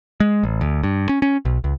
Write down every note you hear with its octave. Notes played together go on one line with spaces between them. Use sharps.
G#3
A1
D2
G2
C#4
C#4
B1
C#2